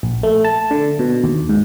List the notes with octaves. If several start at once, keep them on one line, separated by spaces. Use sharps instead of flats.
A#1
A3
A5
D3
B2
D#2
G#2